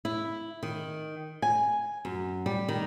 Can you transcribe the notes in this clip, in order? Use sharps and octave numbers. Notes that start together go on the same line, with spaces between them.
E4
D#3
G#5
F#2
G3
D#3